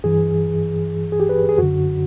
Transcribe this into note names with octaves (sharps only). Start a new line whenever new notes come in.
G2 E3 G#4
G#4
G4
B4
G#4
F#2 D3 F#4